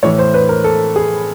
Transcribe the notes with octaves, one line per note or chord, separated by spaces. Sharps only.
A2 E3 C#5
C5
B4
A#4
A4
G#4